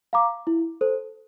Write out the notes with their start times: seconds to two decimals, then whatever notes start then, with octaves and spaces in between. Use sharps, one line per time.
0.13 F5 A#5 D6
0.47 E4
0.81 A4 C5